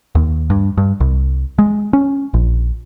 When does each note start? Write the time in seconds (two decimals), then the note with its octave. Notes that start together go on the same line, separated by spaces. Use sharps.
0.15 D#2
0.50 G2
0.77 G2
1.00 C2
1.59 G#3
1.93 C#4
2.34 A#1